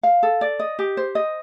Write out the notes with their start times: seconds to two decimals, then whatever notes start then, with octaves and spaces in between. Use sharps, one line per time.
0.03 F5
0.23 A4
0.41 D5
0.60 D#5
0.79 G4
0.97 C5
1.15 D#5